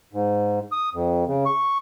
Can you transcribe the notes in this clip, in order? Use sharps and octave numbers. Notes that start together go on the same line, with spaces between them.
G#2
D#6
F2
C#3
C#6